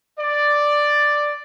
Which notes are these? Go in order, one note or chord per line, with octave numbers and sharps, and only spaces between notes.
D5